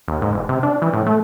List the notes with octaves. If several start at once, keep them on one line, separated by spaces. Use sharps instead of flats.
D#2
G#2
E1
C3
D4
E3
A2
A3